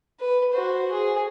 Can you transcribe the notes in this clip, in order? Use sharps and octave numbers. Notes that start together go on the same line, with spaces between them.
B4
F#4 C5
G#4